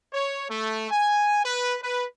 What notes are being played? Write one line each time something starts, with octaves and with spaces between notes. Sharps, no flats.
C#5
A3
G#5
B4
B4